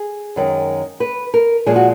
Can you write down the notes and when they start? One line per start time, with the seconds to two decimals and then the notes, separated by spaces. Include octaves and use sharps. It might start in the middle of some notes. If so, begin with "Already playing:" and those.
Already playing: G#4
0.36 F#2 D#3 G#3
1.00 B4
1.34 A#4
1.66 A#2 F3 G#3 G#4
1.76 F#4